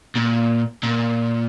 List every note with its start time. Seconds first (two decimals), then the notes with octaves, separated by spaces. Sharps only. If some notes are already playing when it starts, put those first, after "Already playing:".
0.16 A#2
0.83 A#2